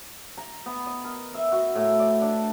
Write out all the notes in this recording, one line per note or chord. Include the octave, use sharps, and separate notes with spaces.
A#5
B3
D#5
A#4
E5
F#4
A2
D5
D4